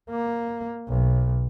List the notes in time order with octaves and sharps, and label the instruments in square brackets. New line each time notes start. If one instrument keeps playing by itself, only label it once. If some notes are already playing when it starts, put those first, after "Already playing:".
[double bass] A#3
B1